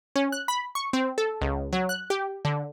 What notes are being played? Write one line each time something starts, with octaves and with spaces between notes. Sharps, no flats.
C#4
F#6
B5
C#6
C4
A4
C#2
F#3
F#6
G4
D3